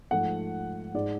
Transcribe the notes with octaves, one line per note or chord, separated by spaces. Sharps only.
G#2 F3 A3 F#5
G#2 G#3 D5